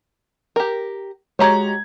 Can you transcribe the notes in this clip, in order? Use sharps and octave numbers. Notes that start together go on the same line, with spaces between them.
G4 A#4
G#3 F#4 G4 C#5 A#5 G#6